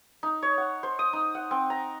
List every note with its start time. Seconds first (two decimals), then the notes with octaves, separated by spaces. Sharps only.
0.23 D#4
0.43 C#5
0.58 F#5
0.83 C5
0.99 D#6
1.13 D#4
1.35 F#5
1.51 C4
1.70 A#5